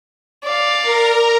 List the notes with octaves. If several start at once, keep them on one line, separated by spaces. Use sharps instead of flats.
D5 F5
A#4 A#5